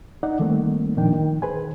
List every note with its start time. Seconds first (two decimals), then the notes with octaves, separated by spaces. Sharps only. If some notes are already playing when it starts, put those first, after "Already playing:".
0.23 D#4 D5 F#5
0.39 D#3 G3 A3 A#3 C4
0.97 F2 A#2 D#3 F3 D4 G5
1.14 D#3
1.42 G#4 B4 C5 G#5